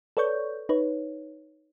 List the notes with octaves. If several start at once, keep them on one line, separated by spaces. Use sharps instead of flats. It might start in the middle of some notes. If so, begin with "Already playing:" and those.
A4 B4 C#5 D5 C#6 G6
D#4 B4 C#5